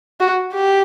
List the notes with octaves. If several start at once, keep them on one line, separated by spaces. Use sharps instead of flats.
F#4
G4